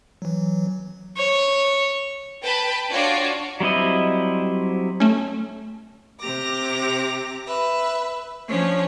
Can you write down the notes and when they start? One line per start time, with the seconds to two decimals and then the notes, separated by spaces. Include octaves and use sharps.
0.22 E3 F#3
1.18 C#5
2.42 B4 G5 A5 B5
2.91 D4 F4 F#4 C#5 D5
3.60 F#3 G3 C4 E4 D#5
5.00 A3 C#4
6.20 C3 G4 A#5 D6 A#6
7.47 B4 E5
8.48 F3 C#4 D4 C#5